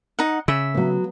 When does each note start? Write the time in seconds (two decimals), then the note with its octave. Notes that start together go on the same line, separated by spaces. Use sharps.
0.19 D#4 F#5
0.48 C#3 E5
0.74 F#3 B3